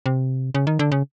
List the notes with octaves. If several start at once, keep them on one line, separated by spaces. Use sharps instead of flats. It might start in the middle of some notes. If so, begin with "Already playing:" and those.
C3
C#3
D#3
D3
C#3